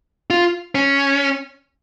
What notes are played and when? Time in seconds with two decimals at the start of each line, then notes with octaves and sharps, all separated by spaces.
0.30 F4
0.75 C#4